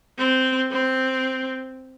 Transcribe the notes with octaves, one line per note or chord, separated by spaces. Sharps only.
C4
C4